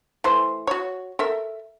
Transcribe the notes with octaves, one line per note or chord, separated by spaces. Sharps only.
E3 A3 C5
F#4 C#5
A4 A#4 E5